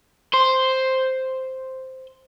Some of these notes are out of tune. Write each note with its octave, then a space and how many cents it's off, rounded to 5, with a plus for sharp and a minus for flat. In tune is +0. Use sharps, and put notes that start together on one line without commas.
C5 +0 C6 +0